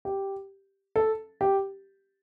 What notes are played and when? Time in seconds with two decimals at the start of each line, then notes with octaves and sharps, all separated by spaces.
0.05 G4
0.96 A4
1.41 G4